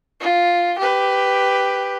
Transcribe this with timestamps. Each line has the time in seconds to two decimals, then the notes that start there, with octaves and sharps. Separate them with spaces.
0.20 F4
0.78 G4 B4